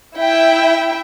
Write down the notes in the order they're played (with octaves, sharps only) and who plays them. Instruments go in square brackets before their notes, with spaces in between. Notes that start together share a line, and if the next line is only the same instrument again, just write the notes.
[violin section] E4 E5 G5